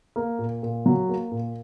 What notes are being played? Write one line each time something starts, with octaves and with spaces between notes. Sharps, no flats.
A#3
A#2
A#2
F#3
A#3
A#2